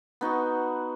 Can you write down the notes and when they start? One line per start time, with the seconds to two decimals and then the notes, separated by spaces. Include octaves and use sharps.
0.21 B3 D#4 F#4 C#6